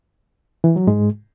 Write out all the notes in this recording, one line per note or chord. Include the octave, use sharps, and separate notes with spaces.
E3
F#3
G#2 G#3